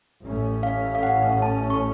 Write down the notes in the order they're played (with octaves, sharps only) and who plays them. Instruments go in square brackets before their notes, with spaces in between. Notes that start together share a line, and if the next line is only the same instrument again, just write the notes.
[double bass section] A1 A2 A3 C#4
[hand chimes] F5
F5
F#5
A5
C#6